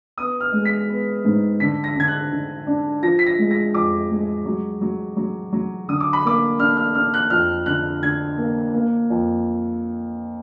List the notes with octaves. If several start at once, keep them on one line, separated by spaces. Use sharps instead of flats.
B3 D#6
F6
G#3
B6
B3
G#2
D3 B6
A#6
D3 G#6
F#6
D3
D4
F3 A#6
B6
A#6
G#3
A#6
F2 D6
G#3
F#3
F#3
F#3
F#3
D3 D#6
D6
B5
A#3 D6
D4 F6
F6
D4 F6
F#6
F2 F6
D3 F#6
D3 G#6
A#3
A#3
F2